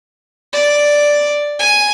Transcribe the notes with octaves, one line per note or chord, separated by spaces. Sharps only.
D5
G#5